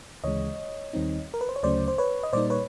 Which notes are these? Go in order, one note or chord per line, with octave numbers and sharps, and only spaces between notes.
D2 C#3 E3 G#3 C#5 D#5
D#2 D#3 G3 C4 D#4
A#4
B4
C5
C#5
D2 C#3 F#3 A3 C#4 C5 D5
C5
B4 C#5
D#5
A#2 G3 A#3 D#4 C5 D5
B4 C#5